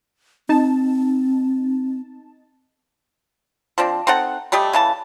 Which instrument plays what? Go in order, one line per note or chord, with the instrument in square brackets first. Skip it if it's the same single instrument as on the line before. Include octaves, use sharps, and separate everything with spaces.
[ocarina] C4 [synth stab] D#4 A5
[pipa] F3 C4 D4
C4 D#4 A4 F#5
G3 A3 G4 D#5
C#3 E3 A5